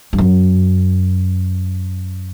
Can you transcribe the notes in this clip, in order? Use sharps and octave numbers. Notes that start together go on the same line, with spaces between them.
G2
F#2